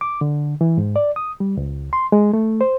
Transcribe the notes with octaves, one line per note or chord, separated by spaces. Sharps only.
D6
D3
E3
G#2
D5
D#6
G3
C#2
C6
G#3
A3
C5